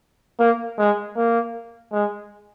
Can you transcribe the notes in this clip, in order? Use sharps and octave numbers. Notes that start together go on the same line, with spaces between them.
A#3
G#3
A#3
G#3